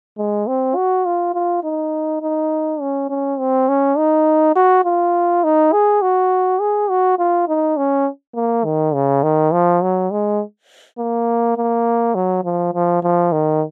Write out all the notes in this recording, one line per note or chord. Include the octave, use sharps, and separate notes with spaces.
G#3
C4
F#4
F4
F4
D#4
D#4
C#4
C#4
C4
C#4
D#4
F#4
F4
D#4
G#4
F#4
G#4
F#4
F4
D#4
C#4
A#3
D#3
C#3
D#3
F3
F#3
G#3
A#3
A#3
F#3
F3
F3
F3
D#3